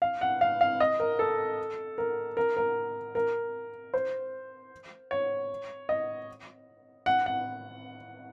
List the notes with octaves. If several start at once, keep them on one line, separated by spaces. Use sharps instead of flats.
F5
F#5
F5
F5
D#5
A#4
A4
A#4
A#4
A#4
A#4
C5
C#5
D#5
F#5
F#5